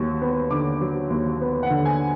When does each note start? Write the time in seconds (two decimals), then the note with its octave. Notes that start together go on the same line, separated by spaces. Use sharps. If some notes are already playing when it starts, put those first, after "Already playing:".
Already playing: D#2 F#3 C#6
0.22 B3
0.51 D3 D6
0.81 F#3
1.10 D#2
1.41 B3
1.63 F#5
1.70 D3
1.86 G#5